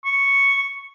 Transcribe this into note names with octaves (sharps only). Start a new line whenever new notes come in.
C#6